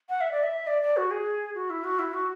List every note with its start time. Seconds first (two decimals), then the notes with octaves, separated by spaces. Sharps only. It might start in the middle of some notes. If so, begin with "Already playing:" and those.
0.09 F#5
0.21 E5
0.32 D5
0.43 E5
0.67 D5
0.82 D5
0.97 F#4
1.11 G#4
1.55 F#4
1.70 E4
1.84 F#4
1.99 E4
2.14 F#4